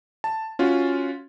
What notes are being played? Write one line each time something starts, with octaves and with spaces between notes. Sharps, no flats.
A5
C#4 F4 F#4